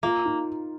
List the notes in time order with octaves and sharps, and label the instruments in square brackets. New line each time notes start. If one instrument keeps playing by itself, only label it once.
[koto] A#3 [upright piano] F4
[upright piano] D#4